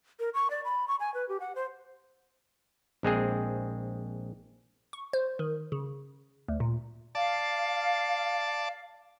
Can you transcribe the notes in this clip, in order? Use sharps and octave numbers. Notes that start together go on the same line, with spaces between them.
A#4
C#6
D5
B5
C#6
G#5
B4
G4
F#5
C5
A#1 G#3 C4 G#4
C#6
C5
D#3
C#3
D2
A#2
D5 F5 A5